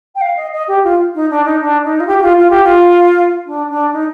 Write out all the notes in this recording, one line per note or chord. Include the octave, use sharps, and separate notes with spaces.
G5
F5
D#5
D#5
G4
F4
D#4
D4
D#4
D4
D#4
F4
G4
G4
F4
F4
G4
F4
D4
D4
D#4